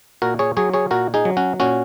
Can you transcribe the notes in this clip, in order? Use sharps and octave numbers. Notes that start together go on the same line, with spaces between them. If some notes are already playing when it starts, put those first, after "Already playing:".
A#2 F#4 A#4
G#4 C#5
F#3 G#4 C#5
G#4 C#5
A#2 F#4 A#4
D#4 G#4
F#3
C#4 F#4
A#2 C#4 F#4